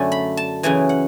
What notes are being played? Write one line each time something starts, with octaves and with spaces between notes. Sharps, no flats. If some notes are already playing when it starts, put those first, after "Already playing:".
Already playing: F#2 D3 A3 D4 G#5
B5
A5
F#2 C#3 E3 G#5
F#5